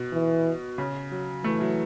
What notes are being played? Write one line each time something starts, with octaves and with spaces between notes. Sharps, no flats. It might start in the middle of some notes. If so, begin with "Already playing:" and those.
Already playing: B2
E3
C#3
F#3
E3 A3
F#3